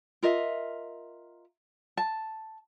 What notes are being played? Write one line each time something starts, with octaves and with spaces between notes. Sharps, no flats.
F4 A#4 D#5 E5
A5